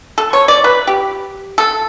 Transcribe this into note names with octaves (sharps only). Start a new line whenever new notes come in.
A4
C#5
D5
B4
G4
A4